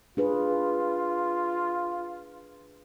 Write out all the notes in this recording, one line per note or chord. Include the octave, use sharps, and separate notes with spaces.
D4 F4 G#4 B4